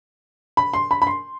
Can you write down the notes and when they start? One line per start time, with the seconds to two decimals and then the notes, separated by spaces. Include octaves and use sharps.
0.57 B5
0.74 C6
0.91 B5
1.02 B5
1.07 C6